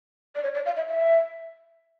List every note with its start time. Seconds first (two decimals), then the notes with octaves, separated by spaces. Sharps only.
0.36 D5
0.43 C#5
0.54 D5
0.66 F5
0.77 E5
0.88 E5